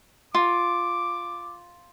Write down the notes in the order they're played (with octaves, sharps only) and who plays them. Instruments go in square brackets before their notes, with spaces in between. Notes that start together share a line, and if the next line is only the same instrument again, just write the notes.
[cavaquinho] F4 [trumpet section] D6